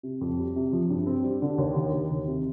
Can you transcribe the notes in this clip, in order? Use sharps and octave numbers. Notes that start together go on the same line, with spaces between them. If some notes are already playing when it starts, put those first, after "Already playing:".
C3
F2
G3
C3
F3
G2
C4
G3
D3
D#2
D#3
D#2
D#3
C3